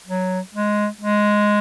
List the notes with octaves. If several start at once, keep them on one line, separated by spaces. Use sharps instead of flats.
F#3
G#3
G#3